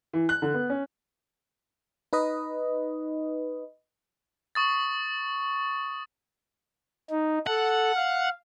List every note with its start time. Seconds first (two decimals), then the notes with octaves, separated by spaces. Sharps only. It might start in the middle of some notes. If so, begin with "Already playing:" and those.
0.13 E3
0.29 F#6
0.42 D3
0.54 B3
0.70 C#4
2.13 D#4 B4 D#5
4.55 C#6 D#6 A6
7.11 D#4
7.47 A4 F#5
7.96 F5